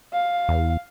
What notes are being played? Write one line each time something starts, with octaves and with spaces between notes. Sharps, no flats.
F5
E2